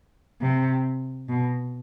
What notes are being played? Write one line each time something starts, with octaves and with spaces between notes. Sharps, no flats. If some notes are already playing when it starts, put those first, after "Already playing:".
C3
B2